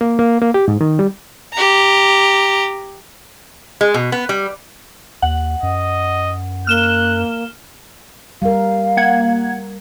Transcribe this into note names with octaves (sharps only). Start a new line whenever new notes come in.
A#3
A#3
A#3
G4
G#2
D#3
G3
G4 A#5
G#3
B2
B3
G3
D#2 F#5
F#2 D#5
A#3 F6 F#6 E7 G7
G3 A#4 F5
A#3 F#5 G#6